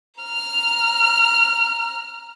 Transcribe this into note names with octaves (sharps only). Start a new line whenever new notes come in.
A#5 F6